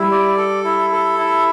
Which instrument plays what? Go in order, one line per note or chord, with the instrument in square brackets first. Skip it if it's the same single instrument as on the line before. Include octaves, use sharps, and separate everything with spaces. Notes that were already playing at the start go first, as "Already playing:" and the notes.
Already playing: [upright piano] G3 [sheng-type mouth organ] E4
[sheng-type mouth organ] D5
A4
E4
A4
E4